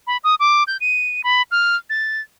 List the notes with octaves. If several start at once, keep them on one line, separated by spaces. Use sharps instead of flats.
B5
D#6
D6
G6
D#7
B5
F6
A6